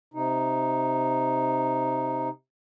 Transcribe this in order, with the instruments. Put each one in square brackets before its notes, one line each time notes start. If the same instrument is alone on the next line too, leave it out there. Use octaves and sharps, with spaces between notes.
[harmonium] C3 D#4